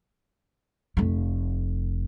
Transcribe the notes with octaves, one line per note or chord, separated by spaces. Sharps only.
F1 A3